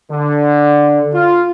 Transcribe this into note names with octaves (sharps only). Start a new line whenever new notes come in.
D3
F4